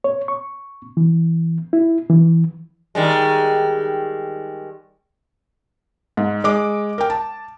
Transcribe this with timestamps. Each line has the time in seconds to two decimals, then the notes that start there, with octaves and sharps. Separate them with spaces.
0.04 C#5
0.28 C#6
0.97 E3
1.73 E4
2.10 E3
2.95 D#3 G3 G#3
6.17 G#2
6.44 G#3 D6
6.98 A#4 G5
7.10 A5